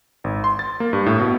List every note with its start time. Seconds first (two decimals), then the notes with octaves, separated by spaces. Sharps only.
0.24 G#1
0.44 C6
0.59 A6
0.80 A#3
0.93 G2
1.06 A2
1.20 B2